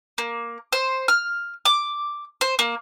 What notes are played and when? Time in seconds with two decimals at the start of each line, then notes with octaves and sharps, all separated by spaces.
0.18 A#3
0.72 C5
1.08 F6
1.65 D6
2.41 C5
2.59 A#3